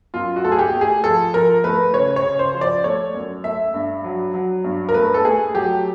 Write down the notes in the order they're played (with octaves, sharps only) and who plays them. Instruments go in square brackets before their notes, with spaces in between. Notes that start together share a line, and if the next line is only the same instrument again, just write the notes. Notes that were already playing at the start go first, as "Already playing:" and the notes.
[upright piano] F#2 F4
F#4
A3 A4
G#4
G4
A3
G#4
F3 A4
F3 A#4
A3 B4
C#3 C#5
C#5
C#3
C5
F3
D5
A3 C#5
F#2
A3 E5
G2
F#3
F#3
G2
A#4
A3 B4
A4
A3 G#4
F#3 G4